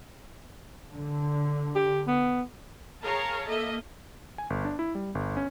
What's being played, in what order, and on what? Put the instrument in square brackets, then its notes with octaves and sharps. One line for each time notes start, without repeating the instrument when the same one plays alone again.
[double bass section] D3
[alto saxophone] G4
B3
[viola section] G#4 A#4 C#5 F5 A5 A#5
A#3 A4 D#5 E5
[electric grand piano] G#5
G1
D4
E4
G3
G1
C#4